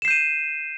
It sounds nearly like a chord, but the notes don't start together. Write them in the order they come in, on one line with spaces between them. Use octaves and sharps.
E7 C7 G6 D#7